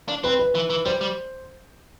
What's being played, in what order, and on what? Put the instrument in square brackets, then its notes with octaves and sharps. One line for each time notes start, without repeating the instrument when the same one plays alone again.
[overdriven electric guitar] D4
[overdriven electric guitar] C4 [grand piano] B4
[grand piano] B4
[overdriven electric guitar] E3
E3
[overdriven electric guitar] G3 [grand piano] C5
[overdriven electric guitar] G3